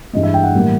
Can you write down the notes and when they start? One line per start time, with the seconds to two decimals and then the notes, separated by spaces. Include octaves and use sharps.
0.13 G2 E3 G#3 D#5
0.23 E5
0.34 G5
0.44 F#5
0.54 A2 E3 G3 A#3